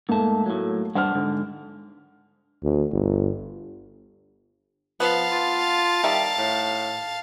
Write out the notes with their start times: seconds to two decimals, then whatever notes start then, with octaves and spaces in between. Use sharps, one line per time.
0.09 G#2 A3 A#3 A5
0.46 A2 F#3
0.95 G2 D4 C5 F#5 F6
1.15 G#2 D3
2.63 D2
2.92 G1
5.00 F3 B3 F5 A5
5.31 F4
6.03 D#3 G3 E5
6.38 A2